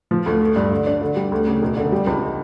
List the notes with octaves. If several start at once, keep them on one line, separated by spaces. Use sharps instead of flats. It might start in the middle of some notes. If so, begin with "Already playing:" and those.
F3
D2
A3
G2
D3
D4
D3
G3
D2
C#3
E1
D3
G3
C#2